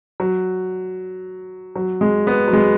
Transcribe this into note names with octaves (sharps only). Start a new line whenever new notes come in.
F#3
F#3
G#3
B3
F#3
G#3